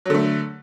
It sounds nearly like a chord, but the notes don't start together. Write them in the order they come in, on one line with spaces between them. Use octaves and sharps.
F#3 D3 A3